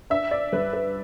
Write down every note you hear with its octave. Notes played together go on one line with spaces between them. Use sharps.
D4 E5
D5
G2 B4
B4